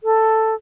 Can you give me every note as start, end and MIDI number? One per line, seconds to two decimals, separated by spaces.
0.04 0.55 69